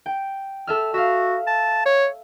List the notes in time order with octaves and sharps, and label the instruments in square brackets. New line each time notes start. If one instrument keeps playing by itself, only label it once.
[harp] G5
A4 E5 F6
[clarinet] F#4 [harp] E5 F5
[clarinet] A5
C#5